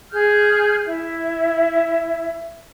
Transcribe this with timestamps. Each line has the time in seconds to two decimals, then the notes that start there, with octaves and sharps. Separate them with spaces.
0.12 G#4 F6 G6
0.86 E4 E5